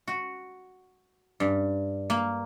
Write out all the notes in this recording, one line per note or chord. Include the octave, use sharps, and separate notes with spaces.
F#4
G2
A#3